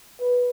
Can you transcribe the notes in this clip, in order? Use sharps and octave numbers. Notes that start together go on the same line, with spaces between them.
B4